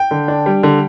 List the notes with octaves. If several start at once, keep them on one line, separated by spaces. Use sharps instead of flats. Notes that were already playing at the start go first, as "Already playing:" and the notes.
Already playing: G5
D3
D4
G3
D3